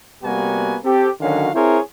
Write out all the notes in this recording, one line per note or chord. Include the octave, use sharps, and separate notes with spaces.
C3 G3 A#3 B3 F#4 G#5
C4 G4 A4
D3 D#3 F#3 C#4 F#4 F5
C4 E4 G#4 A#4 C5 C#5